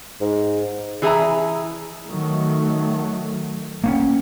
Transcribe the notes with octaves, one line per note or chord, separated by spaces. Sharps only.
G#2
E3 G#4 E5 A#5
D#3 F#3 A3
A#3 C4 C#4